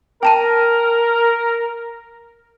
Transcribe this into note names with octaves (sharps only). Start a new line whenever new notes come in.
A#4 G5 A5 D#7